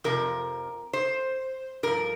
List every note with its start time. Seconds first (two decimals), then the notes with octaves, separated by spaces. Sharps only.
0.04 F2 C3 F3 A#4
0.93 C5
1.83 G2 F3 A#4